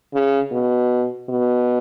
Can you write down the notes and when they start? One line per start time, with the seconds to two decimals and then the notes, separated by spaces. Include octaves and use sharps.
0.13 C#3
0.51 B2
1.29 B2